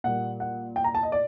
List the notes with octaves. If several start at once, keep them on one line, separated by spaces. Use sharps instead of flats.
A#2 G3 A#3 F#5
F#5
G5
A#5
A5
D#5
D5